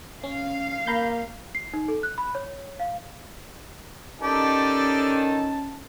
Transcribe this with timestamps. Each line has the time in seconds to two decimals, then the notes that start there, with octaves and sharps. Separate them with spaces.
0.24 C#4 F5
0.87 A#3 A#5 B5 G6
1.55 C7
1.73 D#4
1.88 A4
2.03 F#6
2.18 B5
2.35 C#5
2.80 F5
4.21 D#3 C#4 D#4 G4 A4 D5 A5